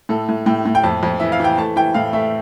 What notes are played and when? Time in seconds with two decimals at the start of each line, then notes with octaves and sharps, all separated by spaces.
0.09 A2 A4
0.29 A2
0.46 A2 G5
0.65 A2
0.75 G5
0.83 F2 A5
1.03 F2
1.20 E3 E5
1.32 F5
1.40 E3 G5
1.58 A3 A5
1.76 E3 G5
1.94 A2 F5
2.13 A3 E5